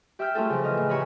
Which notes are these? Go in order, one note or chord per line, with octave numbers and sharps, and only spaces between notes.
G4 E5 G5 E6 F6 G6
A3 C#4 F4 G#4 A4
C#3 F3
E3 G#4 D#5 F6
A2
G4 C#5 E5 G#5 A#5 B5